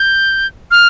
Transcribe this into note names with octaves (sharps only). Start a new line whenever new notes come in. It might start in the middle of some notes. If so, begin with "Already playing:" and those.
Already playing: G6
F6